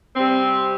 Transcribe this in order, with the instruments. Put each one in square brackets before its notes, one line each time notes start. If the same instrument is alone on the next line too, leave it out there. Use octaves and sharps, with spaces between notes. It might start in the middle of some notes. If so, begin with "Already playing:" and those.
[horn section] C3 G3 C4